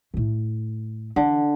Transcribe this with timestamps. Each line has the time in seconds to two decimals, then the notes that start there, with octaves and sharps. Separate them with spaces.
0.14 A2 A3
1.16 D3 E3